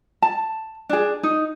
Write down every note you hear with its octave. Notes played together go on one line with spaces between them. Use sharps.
A5
D4 G#4
D#4